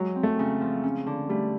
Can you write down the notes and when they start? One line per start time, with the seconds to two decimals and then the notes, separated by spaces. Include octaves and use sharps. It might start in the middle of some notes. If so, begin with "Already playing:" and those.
Already playing: F#3 G#3
0.16 C4
0.23 A3
0.39 C#3
0.61 F3
0.84 C#4
1.06 D3
1.29 G3 A3